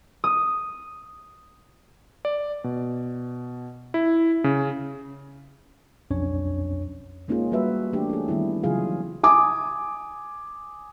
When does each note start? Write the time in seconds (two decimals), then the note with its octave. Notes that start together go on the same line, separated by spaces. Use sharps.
0.24 D#6
2.25 D5
2.64 B2
3.94 E4
4.44 C#3
6.11 B1 F2 C#4 D4 C#5
7.28 G#3 A#3 C#4 D#4 F4 G#4
7.52 G3 F#4 B4 E5
7.93 E3 A3 D4 G4
8.10 C#4 G#4
8.28 D#3 G3 B3 E4
8.63 C#3 E3 F#3 F4 G#4 F5
9.23 G#5 D6 D#6